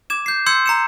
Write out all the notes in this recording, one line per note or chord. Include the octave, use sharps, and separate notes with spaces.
D6 G#6 E7
G6 C7
C6 E6 G6 G#6 C#7
A#5 C#7 E7